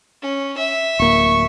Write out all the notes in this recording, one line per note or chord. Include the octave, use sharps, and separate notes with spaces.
C#4
E5
D1 A#3 C#6